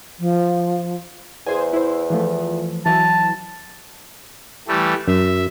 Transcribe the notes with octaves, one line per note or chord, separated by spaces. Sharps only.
F3
E2 G#4 C5 G#5
E4 C5
E3 F3 A3
E3 F#3 E4 A5
E3 G3 A3
F#2 E5